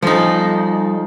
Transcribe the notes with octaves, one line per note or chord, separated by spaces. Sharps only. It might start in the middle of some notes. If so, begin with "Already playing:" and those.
F3 G3 D#4 A4 D5